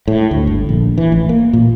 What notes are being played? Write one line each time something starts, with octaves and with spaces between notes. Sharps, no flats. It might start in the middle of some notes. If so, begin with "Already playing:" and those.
A2
D2
G1
A#1
E3
A1
A#3
A#2